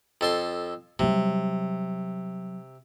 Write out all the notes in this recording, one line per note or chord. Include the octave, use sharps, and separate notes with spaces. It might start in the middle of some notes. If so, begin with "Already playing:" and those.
F2 A4 C6
C3 F#3 G3